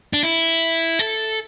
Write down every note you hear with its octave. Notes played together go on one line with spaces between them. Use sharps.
D4
E4
A4